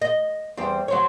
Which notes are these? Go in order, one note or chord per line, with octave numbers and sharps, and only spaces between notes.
D#5
E2 G3 C4
F#3 C4 C#5